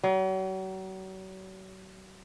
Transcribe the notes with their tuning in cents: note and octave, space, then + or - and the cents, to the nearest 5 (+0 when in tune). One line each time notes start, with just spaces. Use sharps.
F#3 +40